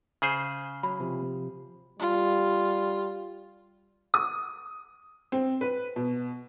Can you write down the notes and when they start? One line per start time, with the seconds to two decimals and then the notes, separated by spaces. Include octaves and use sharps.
0.22 C#3 G#4 C5
0.83 F#3 B5
1.00 C3 F3
1.99 G3 F4
4.14 D#6
5.32 C4
5.61 B4
5.96 B2